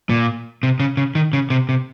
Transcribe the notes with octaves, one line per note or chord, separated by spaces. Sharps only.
A#2
C3
C#3
C#3
D#3
C#3
C3
C3